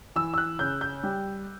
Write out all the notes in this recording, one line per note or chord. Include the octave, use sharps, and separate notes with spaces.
E3 E6
E6
F#6
C#3 G6
G6
G3